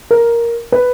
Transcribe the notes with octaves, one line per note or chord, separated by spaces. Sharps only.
A#4
B4